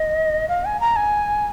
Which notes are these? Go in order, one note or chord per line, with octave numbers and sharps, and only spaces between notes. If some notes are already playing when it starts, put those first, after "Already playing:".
Already playing: D#5
F5
G#5
A#5
G#5